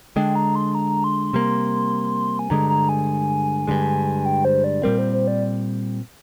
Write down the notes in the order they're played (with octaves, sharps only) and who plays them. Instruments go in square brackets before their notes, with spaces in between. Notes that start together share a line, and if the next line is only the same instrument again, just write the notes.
[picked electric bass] D3 G#3 D4 [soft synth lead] G5
[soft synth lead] A#5
C6
A#5
C6
[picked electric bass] C3 G3 A#3
[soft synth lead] G#5
[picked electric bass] G2 D3 G#3 [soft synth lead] A#5
[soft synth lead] A#5
G#5
[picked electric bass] G2 D3 G#3
[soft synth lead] G5
C5
D5
[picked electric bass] A#2 G3 C4 [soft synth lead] A#4
[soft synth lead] C5
C5
D5